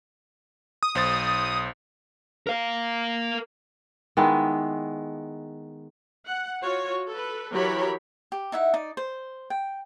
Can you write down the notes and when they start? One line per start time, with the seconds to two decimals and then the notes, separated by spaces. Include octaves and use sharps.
0.83 D#6
0.95 B1 C5 A6
2.47 A#4 F5
4.17 D#3 G#3 B3 E4
6.27 F#5
6.62 F4 F#4 C#5
7.09 A4 B4
7.52 E3 F#3 G4 A#4 C#5 B5
8.32 G4
8.52 D#4 E4 E5 F#5
8.74 D#4 D5
8.97 C5
9.50 G5